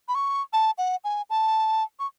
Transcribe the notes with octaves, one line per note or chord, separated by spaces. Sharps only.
B5
C#6
A5
F#5
G#5
A5
C#6